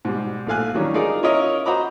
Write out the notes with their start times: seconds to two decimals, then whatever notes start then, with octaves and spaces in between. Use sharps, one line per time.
0.05 G#2 B2 G3
0.47 A#1 G#2 A3 F5 G#5 F#6
0.74 D#3 E3 F#3 G3 C#4 D4
0.94 D#4 F4 G#4 A#4 D5
1.23 C#4 E4 F4 A#4 C#5 D#5
1.65 F#4 C5 D#5 A#5 B5 D6